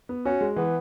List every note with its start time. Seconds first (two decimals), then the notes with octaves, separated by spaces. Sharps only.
0.09 B3
0.25 C#4 F#4
0.41 G#3
0.56 E3 B3